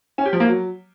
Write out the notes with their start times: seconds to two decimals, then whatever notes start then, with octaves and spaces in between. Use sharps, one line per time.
0.18 C#4
0.25 G4
0.33 F3
0.40 A#3
0.47 F#3